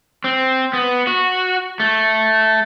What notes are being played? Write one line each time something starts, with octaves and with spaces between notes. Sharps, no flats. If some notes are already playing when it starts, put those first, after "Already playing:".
C4
B3
F#4
A3